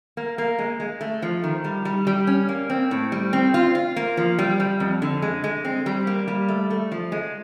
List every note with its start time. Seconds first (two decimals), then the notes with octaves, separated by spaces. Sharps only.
0.17 A#3
0.38 A#3
0.59 G#3
0.80 G#3
1.01 A3
1.22 F3
1.44 D#3
1.64 G3
1.85 G3
2.07 G3
2.27 C#4
2.49 A#3
2.70 C4
2.91 A2
3.12 G3
3.33 C4
3.54 F4
3.75 F4
3.96 A#3
4.17 F3
4.39 G3
4.60 G3
4.80 F2
5.02 D3
5.22 G#3
5.44 G#3
5.65 C4
5.86 G3
6.07 A#3
6.28 G3
6.48 A3
6.70 A3
6.92 F3
7.12 G#3